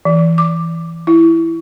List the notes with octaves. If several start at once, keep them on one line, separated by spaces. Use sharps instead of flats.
E3
D6
E4